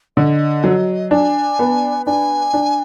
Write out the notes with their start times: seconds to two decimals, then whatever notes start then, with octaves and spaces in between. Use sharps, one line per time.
0.17 D3 D#5
0.64 F#3
1.11 D4 G#5
1.59 B3
2.06 D4 G#5
2.53 D4